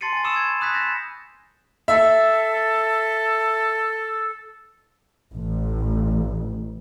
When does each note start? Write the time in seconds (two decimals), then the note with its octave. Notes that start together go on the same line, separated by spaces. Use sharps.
0.01 A5 C6 A6 C7 C#7 D#7
0.13 G#5 A6
0.24 B5 C#6 D#6 E6 C#7 E7
0.36 G#6
0.61 B5 D#6 F#6 G#6 B6
0.74 G6 A6 A#6 E7
1.88 A4 E5
5.32 A1